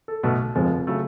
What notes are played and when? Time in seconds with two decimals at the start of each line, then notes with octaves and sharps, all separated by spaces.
0.08 A4
0.23 B1 B2 A3
0.55 F1 F2 F3 G#3
0.87 C#3 F#3 A3 A4